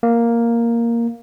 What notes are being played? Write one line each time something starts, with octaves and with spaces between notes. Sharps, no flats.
A#3